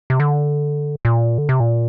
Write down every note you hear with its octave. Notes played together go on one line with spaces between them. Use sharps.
C3
D3
A#2
D3
C3
A#2